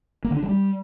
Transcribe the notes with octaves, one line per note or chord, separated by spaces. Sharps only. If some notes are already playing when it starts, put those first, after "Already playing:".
A#3
D3
D4
F#3
G3